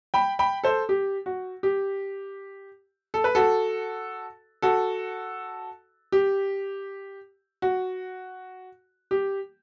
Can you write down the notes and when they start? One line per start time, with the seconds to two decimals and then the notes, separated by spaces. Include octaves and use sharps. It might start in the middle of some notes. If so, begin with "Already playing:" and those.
0.14 G5 B5
0.39 G5 B5
0.64 A4 C5
0.89 G4
1.26 F#4
1.63 G4
3.14 A4
3.24 B4
3.35 F#4 A4
4.62 F#4 A4
6.12 G4
7.62 F#4
9.11 G4